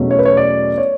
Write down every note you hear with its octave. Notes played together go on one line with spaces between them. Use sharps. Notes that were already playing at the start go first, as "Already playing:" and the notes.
Already playing: E2 B2 F#3 A3 C#4
C#5
B4
C#5
D5
C#5